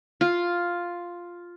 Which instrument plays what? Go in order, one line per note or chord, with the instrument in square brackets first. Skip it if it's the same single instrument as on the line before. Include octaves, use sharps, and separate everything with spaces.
[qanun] F4